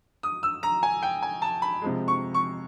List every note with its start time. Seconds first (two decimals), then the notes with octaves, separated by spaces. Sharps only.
0.23 D#6
0.43 E6
0.63 A#5
0.83 G#5
1.03 G5
1.22 G#5
1.42 A5
1.62 B5
1.82 C3 F3 G#3
2.08 C#6
2.34 C#6